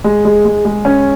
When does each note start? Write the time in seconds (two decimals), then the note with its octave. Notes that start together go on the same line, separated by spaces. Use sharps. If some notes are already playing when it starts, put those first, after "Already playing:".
0.04 G#3
0.25 G#3
0.45 G#3
0.65 G#3
0.85 C#4